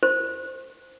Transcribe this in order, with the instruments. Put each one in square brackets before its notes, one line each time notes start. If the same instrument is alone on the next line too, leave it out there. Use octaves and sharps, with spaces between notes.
[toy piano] C5